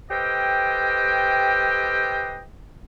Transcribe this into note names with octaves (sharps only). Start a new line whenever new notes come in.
G4 A4 B4 C5 D#5 G5